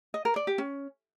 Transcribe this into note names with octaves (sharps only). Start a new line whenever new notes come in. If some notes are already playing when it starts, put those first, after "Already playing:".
D#5
A#4
D5
G4
C#4